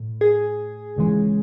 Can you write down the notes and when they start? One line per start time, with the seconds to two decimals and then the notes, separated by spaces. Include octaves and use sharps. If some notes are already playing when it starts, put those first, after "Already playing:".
Already playing: A2
0.21 G#4
0.96 C#2 C#3 E3 G#3